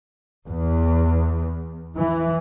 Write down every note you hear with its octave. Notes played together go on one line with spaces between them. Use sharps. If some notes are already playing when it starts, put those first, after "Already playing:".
E2
E3